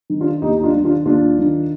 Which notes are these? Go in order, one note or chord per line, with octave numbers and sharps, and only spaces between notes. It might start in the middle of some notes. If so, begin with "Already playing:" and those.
D#3
D4 F4
D#2 D#4 G4
D#4
D4 F4
D#3
D4 F4
D#2 D4 F4
D#3